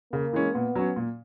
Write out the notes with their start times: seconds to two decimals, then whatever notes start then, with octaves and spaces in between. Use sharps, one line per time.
0.12 C#3 A#3
0.33 E3 G#3 C#4
0.54 A#2 B3
0.75 F#3 C#4
0.96 A#2